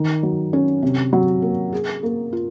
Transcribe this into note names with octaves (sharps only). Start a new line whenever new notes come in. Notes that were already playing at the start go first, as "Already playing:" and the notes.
Already playing: D#3
F#3
C#4
C3
F#3
A#3
G#4
A#3
F4